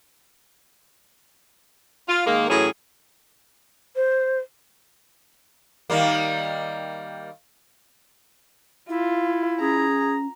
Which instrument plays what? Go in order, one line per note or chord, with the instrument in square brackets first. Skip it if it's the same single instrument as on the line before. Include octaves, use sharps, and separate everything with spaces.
[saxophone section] F4
D#3 G#3 A#3
A2 E3 F#3 C#4 G#4
[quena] C5
[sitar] D#3 G3 A#3
[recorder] E4 [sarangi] F4
[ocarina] C#4 [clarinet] G#4 [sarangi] A#5